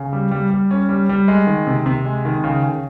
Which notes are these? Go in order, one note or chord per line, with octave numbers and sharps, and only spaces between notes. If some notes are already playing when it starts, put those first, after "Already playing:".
Already playing: C#3
G3
G3
G3
C#4
G3
G3
G#3
D#3
C3
C3
G#3
D#3
C#3
C#3